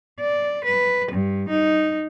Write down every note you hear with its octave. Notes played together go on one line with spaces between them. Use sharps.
D5
B4
G2
D#4